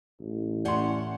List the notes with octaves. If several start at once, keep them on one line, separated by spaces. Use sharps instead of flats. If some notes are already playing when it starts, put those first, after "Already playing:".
A1
A2 C#4 D5 F#5 C6